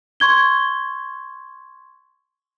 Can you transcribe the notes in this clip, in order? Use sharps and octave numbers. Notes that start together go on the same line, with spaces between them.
C6 C#6 G#6 G7